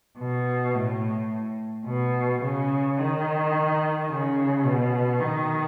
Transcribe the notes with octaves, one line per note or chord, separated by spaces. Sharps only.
B2
A2
B2
C#3
D#3
C#3
B2
D#3